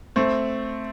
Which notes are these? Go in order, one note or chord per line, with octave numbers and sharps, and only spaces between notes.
A3 C4